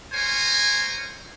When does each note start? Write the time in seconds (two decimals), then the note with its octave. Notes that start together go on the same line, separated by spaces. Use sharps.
0.12 A#4 C5 C#5 G#5